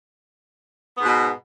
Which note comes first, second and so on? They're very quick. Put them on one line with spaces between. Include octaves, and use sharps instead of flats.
B3 G#2 B2